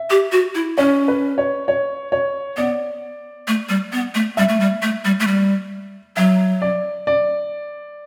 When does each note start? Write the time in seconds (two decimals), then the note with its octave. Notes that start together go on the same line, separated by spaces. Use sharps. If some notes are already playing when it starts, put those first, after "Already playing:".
Already playing: E5
0.10 G4
0.32 F#4
0.55 E4
0.78 C#4 C#5
1.08 B4
1.38 C#5
1.68 C#5
2.12 C#5
2.57 B3 D5
3.48 A3
3.69 G3
3.92 B3
4.15 A3
4.37 G3 E5
4.49 A3
4.60 G3
4.83 A3
5.05 G3
5.20 A3
5.27 G3
6.17 F#3 E5
6.62 D5
7.07 D5